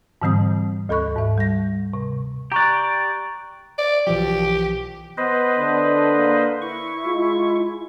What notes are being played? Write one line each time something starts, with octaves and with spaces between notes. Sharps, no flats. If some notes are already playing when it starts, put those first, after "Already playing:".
G#2 D3 E3 G3 C4 D#6
D2 A4 B5 C#6 F#6
G#2 E5
G3 A#6
C3
G4 D5 A#5 C#6 F#6
D5
B1 E3 F3 G4
B3 B4 C5 D#5
D3
A#3
E4 C#6
G#3 F4